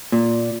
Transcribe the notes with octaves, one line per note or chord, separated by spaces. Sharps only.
A#2